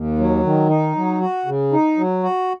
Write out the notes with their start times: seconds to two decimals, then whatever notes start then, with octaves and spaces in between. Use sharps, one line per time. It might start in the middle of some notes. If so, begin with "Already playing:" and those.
Already playing: D#2
0.18 F#3
0.43 D#3
0.69 D#4
0.95 F#3
1.20 F#4
1.46 C#3
1.72 D#4
1.97 F#3
2.23 F#4